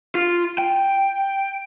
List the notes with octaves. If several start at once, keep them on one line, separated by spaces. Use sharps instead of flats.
F4
G5